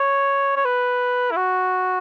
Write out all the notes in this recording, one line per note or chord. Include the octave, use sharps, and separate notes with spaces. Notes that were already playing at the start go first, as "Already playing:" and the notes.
Already playing: C#5
C#5
B4
E4
F#4